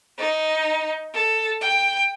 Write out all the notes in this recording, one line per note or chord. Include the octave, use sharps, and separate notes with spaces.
D#4
A4
G5